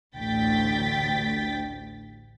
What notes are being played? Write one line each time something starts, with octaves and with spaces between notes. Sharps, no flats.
A1 D2 G5 A6 B6